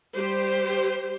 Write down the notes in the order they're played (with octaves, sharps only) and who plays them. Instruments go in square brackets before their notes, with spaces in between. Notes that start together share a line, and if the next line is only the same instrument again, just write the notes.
[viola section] G3 G4 C5